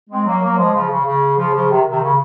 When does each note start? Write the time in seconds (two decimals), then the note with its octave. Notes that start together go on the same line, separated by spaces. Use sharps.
0.10 G#3 C4
0.25 F#3 A#3
0.42 F#3 A#3
0.57 F3 G#3
0.74 C#3 F3
0.90 C#3
1.05 C#3
1.37 C#3 F3
1.53 C#3 F3
1.70 C3 D#3
1.90 C3 D#3
2.02 C#3